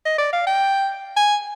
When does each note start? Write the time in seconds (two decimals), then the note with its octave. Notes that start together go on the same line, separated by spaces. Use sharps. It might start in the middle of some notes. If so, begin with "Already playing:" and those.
0.06 D#5
0.18 D5
0.33 F5
0.47 G5
1.16 G#5